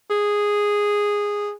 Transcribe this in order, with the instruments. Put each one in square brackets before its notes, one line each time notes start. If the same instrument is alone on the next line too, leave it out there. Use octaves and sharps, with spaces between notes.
[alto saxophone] G#4